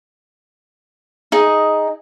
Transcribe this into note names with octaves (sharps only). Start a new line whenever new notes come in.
D#4 G#4 D#5